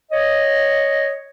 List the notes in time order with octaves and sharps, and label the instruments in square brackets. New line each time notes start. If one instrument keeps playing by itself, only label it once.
[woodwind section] C#5 D#5